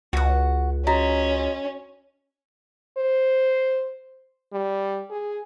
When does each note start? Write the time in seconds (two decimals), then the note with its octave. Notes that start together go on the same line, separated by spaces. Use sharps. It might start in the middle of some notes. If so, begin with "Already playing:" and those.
0.13 C#2 F#4 F#5
0.87 C#4 F#4 D#5 A#5
2.98 C5
4.52 G3
5.10 G#4